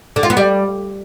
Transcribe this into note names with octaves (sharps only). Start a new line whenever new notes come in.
D3
F4
B3
G3